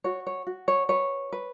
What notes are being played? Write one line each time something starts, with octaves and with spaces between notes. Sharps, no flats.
F#4 C#5
C#5
F#4
C#5
B4 C#5
B4